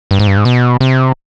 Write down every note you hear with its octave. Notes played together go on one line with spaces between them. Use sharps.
G2
G#2
G2
G#2
B2
C3